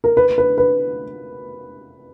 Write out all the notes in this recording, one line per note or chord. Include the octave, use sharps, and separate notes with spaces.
A#4
B4
B4
B4